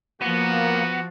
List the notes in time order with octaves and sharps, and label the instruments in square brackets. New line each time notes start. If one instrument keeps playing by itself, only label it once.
[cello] F3 [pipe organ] A#3 [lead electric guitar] B3 [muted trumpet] F#4